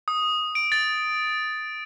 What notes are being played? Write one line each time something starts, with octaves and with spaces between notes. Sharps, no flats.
D#6
D7
A6